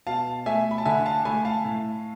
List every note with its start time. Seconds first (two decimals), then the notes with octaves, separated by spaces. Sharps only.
0.07 B2 F5 A5
0.46 A3 E5 G#5
0.71 B5
0.78 A5
0.85 D3 E5 G#5
1.05 F5 A5
1.25 A3 G#5 B5
1.45 F5 A5
1.65 A2